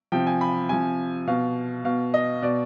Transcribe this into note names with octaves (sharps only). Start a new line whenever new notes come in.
C3 F3 G5
G#5
B5
C3 F3 G#5
B2 F5
B2 F5
D#5
B2 D5